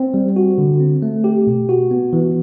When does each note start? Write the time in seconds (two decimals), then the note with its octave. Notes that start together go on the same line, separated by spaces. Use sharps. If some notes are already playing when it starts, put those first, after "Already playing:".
Already playing: C4
0.14 G3
0.36 F#4
0.58 D3
0.80 C4
1.02 A3
1.24 G4
1.47 B2
1.69 F#4
1.91 B3
2.13 E3